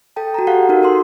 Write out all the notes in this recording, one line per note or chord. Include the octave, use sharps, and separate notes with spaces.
A4 G5 A5
F#4 A4 A#5
G4 A4 F5 F#5
D#4 F#4 A#4
D#4 F#4 A4 A#4 C6